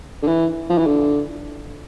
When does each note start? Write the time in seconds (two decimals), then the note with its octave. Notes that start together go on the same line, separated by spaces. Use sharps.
0.23 D3
0.28 E3
0.69 F3
0.78 E3
0.87 D3